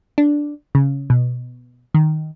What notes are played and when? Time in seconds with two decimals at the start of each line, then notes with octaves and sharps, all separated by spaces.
0.18 D4
0.75 C#3
1.10 B2
1.95 D#3